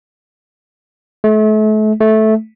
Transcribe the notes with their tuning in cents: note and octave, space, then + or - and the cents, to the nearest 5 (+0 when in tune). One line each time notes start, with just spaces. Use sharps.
A3 -35
A3 -10